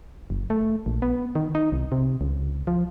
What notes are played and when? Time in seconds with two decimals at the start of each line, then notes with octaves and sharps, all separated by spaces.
0.30 F#1
0.50 A3
0.86 A#1
1.02 B3
1.35 D#3
1.55 D#4
1.72 C2
1.92 C3
2.21 C#2
2.67 F3